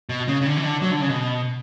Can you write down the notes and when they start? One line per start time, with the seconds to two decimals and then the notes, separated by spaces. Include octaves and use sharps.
0.09 B2
0.28 C#3
0.42 C#3
0.46 D3
0.57 E3
0.64 D3
0.82 F#3
0.91 D3
1.01 C#3
1.09 B2